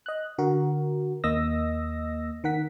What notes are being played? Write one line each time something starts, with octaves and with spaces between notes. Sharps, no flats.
D#5 F#6
D3 F#4 A#4
D#2 A#3 D#5 D#6 E6 A#6
D#3 A#4 F#5 B6